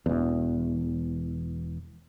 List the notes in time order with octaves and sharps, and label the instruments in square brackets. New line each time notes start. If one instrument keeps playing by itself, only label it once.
[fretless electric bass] E1 E2